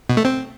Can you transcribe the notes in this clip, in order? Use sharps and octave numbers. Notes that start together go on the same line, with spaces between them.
B2
A3
C4